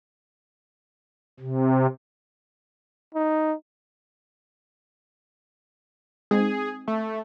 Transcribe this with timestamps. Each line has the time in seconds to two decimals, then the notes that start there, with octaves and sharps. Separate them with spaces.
1.40 C3
3.15 D#4
6.31 G#3 C4 D#4 G#4
6.88 A3